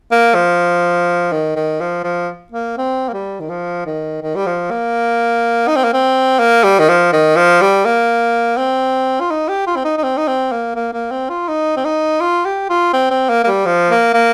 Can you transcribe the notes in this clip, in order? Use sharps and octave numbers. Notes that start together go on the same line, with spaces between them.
A#3
F3
D#3
D#3
F3
F3
A#3
C4
A#3
G3
D#3
F3
D#3
D#3
G3
F3
A#3
D#4
C4
A#3
C4
A#3
G3
D#3
F3
D#3
F3
G3
A#3
C4
F4
D#4
G4
F4
C4
D#4
D#4
C4
D#4
C4
A#3
A#3
A#3
C4
F4
D#4
C4
D#4
F4
G4
F4
C4
C4
A#3
A#3
G3
F3
A#3
A#3